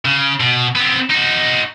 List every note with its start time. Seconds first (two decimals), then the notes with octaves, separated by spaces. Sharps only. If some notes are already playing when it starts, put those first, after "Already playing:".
0.05 C#3
0.40 B2
0.75 B3 C4
1.10 D#4 F#4